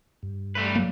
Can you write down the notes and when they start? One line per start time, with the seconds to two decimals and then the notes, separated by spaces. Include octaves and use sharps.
0.23 G2
0.55 G3 A3 B4
0.75 F#3 A#3